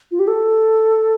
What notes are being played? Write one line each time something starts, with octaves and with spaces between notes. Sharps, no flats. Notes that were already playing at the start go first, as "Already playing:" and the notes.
F4
G4
A4